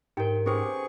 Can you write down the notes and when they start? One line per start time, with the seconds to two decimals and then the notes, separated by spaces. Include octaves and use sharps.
0.17 G#2 D#4 G4 A#4 G5
0.46 C#4 G4 G#4 B4 C5 C#6